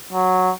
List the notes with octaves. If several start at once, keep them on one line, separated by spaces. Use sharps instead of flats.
F#3